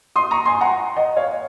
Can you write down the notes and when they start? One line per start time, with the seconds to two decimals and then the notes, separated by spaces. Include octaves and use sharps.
0.16 C6 D#6
0.31 A#5 C#6
0.45 G#5 C6
0.61 F#5 A#5
0.96 D#5 F#5
1.16 C#5 F5